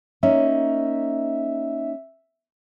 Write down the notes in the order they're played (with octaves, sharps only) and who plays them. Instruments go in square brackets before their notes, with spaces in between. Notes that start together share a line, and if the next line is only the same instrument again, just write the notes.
[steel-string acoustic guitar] A#3 C#4 D#4 [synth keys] E5